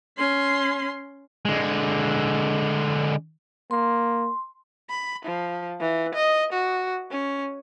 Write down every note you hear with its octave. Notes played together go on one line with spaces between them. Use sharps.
C#4 C6
D3 G#3
A#3 C6
B5
F3
E3
D#5
F#4
C#4